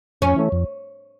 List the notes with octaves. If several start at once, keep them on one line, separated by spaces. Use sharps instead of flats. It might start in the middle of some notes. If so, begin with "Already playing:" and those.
F2 C#4
E3 A3
F2